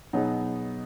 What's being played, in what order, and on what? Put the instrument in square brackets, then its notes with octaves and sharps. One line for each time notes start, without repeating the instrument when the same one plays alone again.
[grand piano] B2 F#3 B3 D#4 G#4